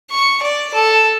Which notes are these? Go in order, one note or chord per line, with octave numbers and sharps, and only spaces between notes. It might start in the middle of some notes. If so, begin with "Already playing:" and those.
C#6
D5
A4